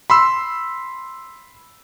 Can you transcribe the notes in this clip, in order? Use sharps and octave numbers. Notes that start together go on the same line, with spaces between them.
B5 C6 E6